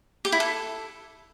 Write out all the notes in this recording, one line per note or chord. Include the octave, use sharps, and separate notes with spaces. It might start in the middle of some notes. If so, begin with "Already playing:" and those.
G4
E4
A4